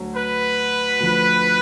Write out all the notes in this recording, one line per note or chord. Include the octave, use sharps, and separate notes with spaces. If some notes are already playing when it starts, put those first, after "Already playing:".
Already playing: D2 F#3
B4
D2 D3 F3